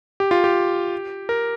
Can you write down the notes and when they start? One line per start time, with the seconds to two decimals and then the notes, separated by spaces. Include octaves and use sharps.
0.20 G4
0.31 F4
0.44 G4
1.29 A#4